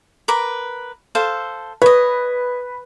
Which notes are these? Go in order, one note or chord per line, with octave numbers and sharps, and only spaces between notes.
A#4 B4 D6
A4 C5 F5
B4 C#5 D#5